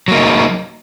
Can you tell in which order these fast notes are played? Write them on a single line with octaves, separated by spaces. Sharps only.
F#3 A#3 D#4